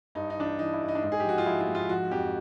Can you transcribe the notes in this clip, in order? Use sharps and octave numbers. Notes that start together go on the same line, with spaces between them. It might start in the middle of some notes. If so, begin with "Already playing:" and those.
G2 D#4
D#4
E3 D4
D#4
E3 D#4
E4
G2
D#4
D4
G#2 D#4
G#4
G4
F3 F#4
F4
F3 E4
F4
G#2
F4
F3 F#4
F2 G4